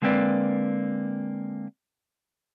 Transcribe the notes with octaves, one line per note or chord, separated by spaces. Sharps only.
D3 G#3 A#3 C4 B4 D5